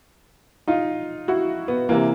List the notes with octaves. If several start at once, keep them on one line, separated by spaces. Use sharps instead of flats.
D#4 F4
E4 F#4
B3
C3 E3 A#3